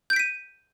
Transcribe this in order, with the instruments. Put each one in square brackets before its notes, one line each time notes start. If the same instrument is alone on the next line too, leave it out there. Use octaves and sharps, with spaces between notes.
[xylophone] G6
D7
B6
D#7